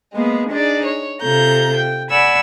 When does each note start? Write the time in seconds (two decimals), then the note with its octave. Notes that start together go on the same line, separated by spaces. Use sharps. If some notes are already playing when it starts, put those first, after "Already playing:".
0.13 G#3 A#3 B3 G#4
0.49 D4 D#4 G#4 D5
0.85 C#5
1.21 C3 F4 A4 A#5 G6
1.76 G5
2.10 D5 F#5 G#5 B5 E6